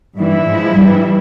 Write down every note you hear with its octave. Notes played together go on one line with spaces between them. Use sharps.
G2 E3 G3 E4
G#2 F3 G#3
G2 E3 G3